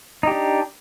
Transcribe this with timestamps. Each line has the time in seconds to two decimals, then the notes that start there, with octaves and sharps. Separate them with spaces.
0.23 D#4
0.27 G4
0.31 D4